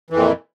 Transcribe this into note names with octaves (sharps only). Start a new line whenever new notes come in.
F2 A#2 E3